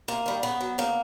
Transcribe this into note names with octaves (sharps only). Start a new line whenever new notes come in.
C3 A#3
D#3 G3
C#3 B3
F#3
C#3 A#3